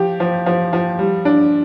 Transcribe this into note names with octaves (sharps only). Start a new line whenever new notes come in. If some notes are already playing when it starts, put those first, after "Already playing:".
Already playing: F3 G4
F3
F3
F3
G3
D4